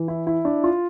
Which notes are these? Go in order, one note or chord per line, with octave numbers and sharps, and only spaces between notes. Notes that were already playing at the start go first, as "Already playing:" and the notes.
Already playing: E3
E4
E4
D4
F4